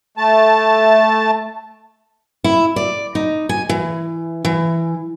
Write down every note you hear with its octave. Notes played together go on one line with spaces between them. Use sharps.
A3 A5
E4
D5
D#4
G#5
E3
E3